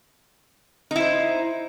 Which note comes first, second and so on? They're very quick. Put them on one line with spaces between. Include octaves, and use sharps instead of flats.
D#4 E4 C5